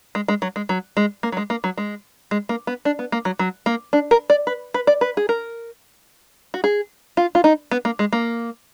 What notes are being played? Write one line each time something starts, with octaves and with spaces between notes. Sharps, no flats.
G#3
G#3
F#3
G#3
F#3
G#3
A#3
F#3
G#3
A#3
F#3
G#3
G#3
A#3
B3
D4
B3
A#3
F#3
F#3
A#3
D4
A#4
D5
B4
B4
D5
B4
G#4
A#4
F#4
G#4
F4
F4
D#4
B3
A#3
G#3
A#3